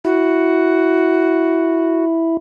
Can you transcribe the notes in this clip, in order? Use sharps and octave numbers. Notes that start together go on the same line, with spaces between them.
E4 F#4